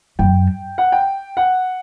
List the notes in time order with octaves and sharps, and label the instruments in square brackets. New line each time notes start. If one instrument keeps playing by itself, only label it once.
[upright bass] F#2 [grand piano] G5
[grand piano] F#5
G5
F#5